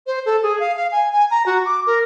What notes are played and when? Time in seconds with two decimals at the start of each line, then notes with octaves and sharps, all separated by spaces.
0.07 C5
0.26 A4
0.43 G#4
0.60 F5
0.76 F5
0.92 G#5
1.12 G#5
1.31 A#5
1.46 F#4
1.65 D6
1.87 A#4